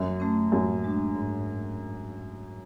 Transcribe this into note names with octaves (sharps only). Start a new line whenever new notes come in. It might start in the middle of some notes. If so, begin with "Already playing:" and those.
Already playing: F#2
A3 C#4
F#2 A2
G#3 D4
G#2